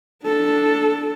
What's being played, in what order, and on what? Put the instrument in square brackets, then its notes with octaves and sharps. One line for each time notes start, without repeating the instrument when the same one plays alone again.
[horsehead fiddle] D4 A4